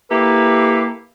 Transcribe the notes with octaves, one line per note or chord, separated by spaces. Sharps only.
A#3 E4 G4 A4 B4